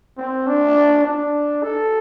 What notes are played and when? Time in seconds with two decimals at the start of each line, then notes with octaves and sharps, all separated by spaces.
0.18 C4
0.47 D4
1.05 D4
1.63 A4